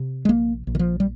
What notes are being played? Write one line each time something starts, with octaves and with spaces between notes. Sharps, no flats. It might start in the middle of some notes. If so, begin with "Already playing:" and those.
Already playing: C3
G#3
A#1 A#3
A#1
D#3
F3
G3